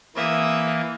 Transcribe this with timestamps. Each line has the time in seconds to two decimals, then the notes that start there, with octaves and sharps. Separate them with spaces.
0.16 E3 A#3 E5 D#6